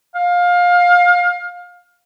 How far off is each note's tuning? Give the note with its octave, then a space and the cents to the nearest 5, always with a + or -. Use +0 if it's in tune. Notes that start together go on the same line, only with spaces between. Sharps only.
F5 +25